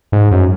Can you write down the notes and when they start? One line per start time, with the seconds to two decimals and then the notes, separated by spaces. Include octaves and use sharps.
0.12 G#2
0.31 F#2